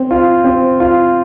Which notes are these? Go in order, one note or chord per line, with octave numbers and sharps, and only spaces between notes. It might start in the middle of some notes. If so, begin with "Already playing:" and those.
Already playing: C4
F4
C4
F4